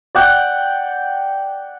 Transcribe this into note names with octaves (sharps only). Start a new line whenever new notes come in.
D5 F#5 G5